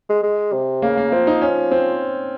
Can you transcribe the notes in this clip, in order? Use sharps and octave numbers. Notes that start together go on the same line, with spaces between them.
G#3
G#3
C3
C#3 A#3
A#3
F3 C4
D#4
C#4
C4